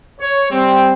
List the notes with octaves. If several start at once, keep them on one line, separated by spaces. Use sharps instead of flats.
C#5
G3 C4